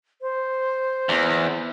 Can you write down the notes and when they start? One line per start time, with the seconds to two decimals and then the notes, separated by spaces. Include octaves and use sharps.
0.22 C5
1.09 E2